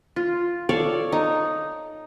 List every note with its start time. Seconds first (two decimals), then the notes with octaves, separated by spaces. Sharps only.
0.16 F4
0.69 A4 C#5 D5 F5
1.12 D#4